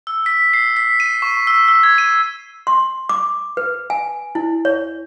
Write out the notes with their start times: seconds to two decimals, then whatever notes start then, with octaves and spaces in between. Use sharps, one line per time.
0.07 E6
0.26 B6
0.53 C7
0.77 B6
1.00 D#7
1.22 C#6
1.47 E6
1.68 E6
1.83 G#6
1.98 D#7
2.67 C6
3.09 D6
3.57 B4
3.90 G#5
4.35 E4
4.65 C#5